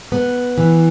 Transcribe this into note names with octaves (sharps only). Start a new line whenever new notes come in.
B3
E3